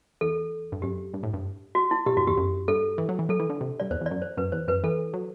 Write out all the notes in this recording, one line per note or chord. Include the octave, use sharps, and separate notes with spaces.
E2 A4
G2
F#2 G4
G2
A2
G2
F#4
E4
B2 G4
G2 F#4
E2 G4
F#2
G2 A4
E3
F#3
E3
F#3 A4
E3
D3
C3
G2 D5
E2 C5
E2 D5
F#2
C5
F#2 B4
E2 C5
F#2 B4
E3 A4
F#3